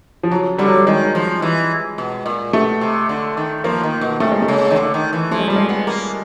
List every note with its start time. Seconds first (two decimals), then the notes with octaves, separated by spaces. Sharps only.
0.23 F3
0.31 C#3 F#3
0.58 D3 G3
0.68 F#3
0.78 G3
0.87 D#3 G#3
1.15 F3
1.42 E3
1.98 B2
2.26 A#2
2.53 B2 A3
2.81 C3
3.09 D3
3.37 D#3
3.64 F3 A#3
3.83 D#3
4.01 B2
4.20 C3 A3
4.31 G#3
4.42 A3
4.48 C#3
4.70 D#3
4.76 D3
4.94 D#3
5.13 E3
5.31 F3 A3
5.39 G#3
5.48 F3 G3
5.56 G#3
5.69 B3
5.87 A#3